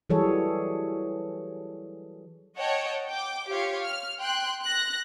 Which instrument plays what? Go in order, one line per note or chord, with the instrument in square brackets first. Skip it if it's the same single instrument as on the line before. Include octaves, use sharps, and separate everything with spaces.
[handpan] E3 F#3 G3 G#4 A4 C#5
[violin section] C#5 D#5 F#5 G5 A5
G5 D6
F4 G4 C#5 F5
F6
G5 C6 F#6
F#6 A#6